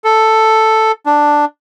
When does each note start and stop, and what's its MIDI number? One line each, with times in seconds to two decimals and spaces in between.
0.04 0.92 69
1.06 1.45 62